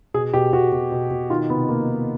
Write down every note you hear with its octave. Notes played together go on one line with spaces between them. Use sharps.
B2 G#4
B2 G4
B2 F#4
B2
B2
B2
D#3 F4
C3 B3
D#3 A#3
D#3